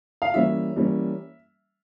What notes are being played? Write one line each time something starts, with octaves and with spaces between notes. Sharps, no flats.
F5
E3 G3 A#3 C#4 E5
E3 G3 A#3 C#4